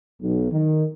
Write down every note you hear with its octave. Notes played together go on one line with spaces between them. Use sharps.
B1
D#3